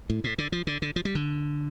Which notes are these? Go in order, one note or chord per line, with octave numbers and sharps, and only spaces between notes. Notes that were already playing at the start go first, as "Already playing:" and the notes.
A2
A2
D3
F3
D3
D3
F3
G3
D3